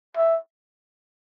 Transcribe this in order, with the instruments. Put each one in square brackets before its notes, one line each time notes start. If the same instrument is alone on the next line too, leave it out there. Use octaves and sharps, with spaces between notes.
[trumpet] E5